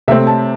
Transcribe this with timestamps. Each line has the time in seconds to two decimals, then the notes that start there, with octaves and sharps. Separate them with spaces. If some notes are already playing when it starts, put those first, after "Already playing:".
0.08 C3 A3 C4 E5
0.27 A5